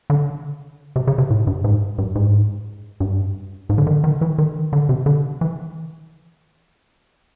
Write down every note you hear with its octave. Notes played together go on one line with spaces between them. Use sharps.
D3
C3
C#3
C3
A2
G2
G#2
G2
G#2
G2
G#2
D3
D#3
D3
D#3
E3
D#3
D3
C3
D3
E3